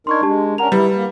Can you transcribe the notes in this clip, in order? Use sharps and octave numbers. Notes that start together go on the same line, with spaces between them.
D4 D#4 A#4 C6 C#6 G#6
G#3 D4 G4 A5
C#4 D4 A#4 F#5 A#5 F7
G3 E4 B4
A#3